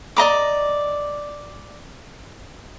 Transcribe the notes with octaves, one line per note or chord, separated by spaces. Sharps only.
D5 D#5 A#5 D6